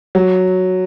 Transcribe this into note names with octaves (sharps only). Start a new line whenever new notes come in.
F#3